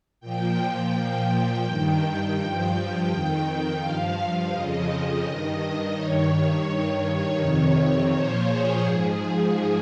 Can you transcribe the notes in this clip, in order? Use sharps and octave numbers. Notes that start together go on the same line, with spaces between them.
A#2 F3 G5
A#2 F3
G2 D#3 G5
G2 F3 G5
F2 D#3
G2 F3 F5
F2 C#3 F3 D#5
G2 D#3
G2 D#3 C#5
G2 D#3
F2 C3 D#3
A#2 F3 C5
G#4
G#2 F3